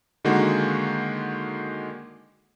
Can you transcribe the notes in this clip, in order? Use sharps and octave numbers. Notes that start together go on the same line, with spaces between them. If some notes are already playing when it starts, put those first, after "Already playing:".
D3 D#3 G#3 A#3 F#4